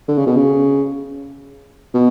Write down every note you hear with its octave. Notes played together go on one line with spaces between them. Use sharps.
D3
C#3
B2
C#3
B2